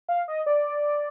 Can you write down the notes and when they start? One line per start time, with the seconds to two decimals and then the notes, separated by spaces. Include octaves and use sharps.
0.09 F5
0.28 D#5
0.46 D5